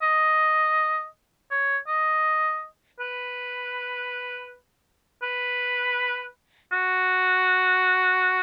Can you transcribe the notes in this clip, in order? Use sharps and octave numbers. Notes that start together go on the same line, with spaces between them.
D#5
C#5
D#5
B4
B4
F#4